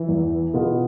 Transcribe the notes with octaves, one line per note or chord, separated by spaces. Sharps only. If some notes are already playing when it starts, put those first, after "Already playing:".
Already playing: E3
E2
B2 B3 F4 G#4